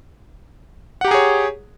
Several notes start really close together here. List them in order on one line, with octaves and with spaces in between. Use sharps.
F#5 G4 A#5 G#4 C#5